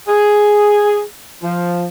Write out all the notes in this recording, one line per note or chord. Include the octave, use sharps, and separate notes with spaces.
G#4
F3